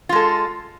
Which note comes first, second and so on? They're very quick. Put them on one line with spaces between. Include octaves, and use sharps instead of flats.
F4 G#3 A4